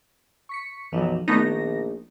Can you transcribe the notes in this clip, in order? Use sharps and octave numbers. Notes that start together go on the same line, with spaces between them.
C#6 B6 C#7
B1 F#2 E3 F3
A#1 D#3 A3 B3 D#4 A#4 A#6